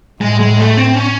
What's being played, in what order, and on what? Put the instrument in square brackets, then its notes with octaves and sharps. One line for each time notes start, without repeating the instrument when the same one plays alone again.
[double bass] A2 [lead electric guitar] G#3
[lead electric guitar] G#3
A3
C4
C#4